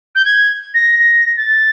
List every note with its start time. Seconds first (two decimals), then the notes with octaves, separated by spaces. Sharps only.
0.15 G6
0.25 G#6
0.74 A#6
0.99 A#6
1.36 A6